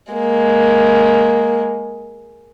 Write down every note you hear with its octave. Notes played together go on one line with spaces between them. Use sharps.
G#3 A#3